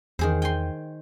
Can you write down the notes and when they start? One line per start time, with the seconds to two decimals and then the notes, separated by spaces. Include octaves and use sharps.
0.19 E2 D#3 G#4 C5
0.42 G5 G#5 C6